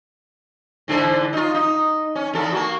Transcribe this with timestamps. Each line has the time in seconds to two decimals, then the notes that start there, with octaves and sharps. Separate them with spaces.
0.88 G#2 D3 E3
1.33 D#4 F4
1.54 D#4
2.15 C#4
2.34 E2 A4
2.52 A#3 F#4